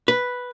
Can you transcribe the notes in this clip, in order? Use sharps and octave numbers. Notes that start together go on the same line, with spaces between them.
B4